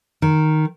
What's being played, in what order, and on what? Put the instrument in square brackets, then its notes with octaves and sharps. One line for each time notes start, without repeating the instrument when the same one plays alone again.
[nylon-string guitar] D#3